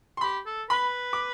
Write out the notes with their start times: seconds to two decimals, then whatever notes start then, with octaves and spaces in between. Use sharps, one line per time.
0.17 C6
0.21 G4 B5
0.46 A4
0.70 B4 B5
1.13 D6